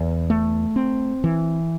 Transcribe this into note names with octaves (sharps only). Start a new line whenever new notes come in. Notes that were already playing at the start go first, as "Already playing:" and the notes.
Already playing: E2
A3
C4
E3